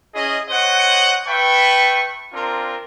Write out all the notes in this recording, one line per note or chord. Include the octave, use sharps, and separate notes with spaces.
C#4 E4 G#4 D#5
C5 C#5 D#5 F#5
B4 E5 G5 A5 C#6
C4 D4 F4 A#4